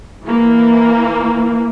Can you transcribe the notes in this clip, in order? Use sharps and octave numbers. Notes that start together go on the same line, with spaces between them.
E3 A#3